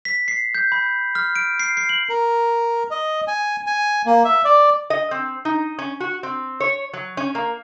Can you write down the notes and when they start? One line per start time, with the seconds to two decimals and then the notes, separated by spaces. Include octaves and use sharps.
0.05 B6
0.28 C7
0.55 G6
0.72 B5
1.15 F6
1.36 D7
1.60 C7
1.77 C7
1.89 F#7
2.09 A#4
2.91 D#5
3.28 G#5
3.66 G#5
4.06 A#3
4.25 E5
4.45 D5
4.90 D#5
5.11 C4
5.45 D#4
5.79 C#4
6.00 F#4
6.23 C4
6.60 C#5
6.93 F#3
7.17 C#4
7.35 A#3